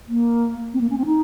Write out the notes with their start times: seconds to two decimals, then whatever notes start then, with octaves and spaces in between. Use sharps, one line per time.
0.08 A#3
0.74 C4
0.81 A#3
0.90 C#4
0.98 C4
1.06 D#4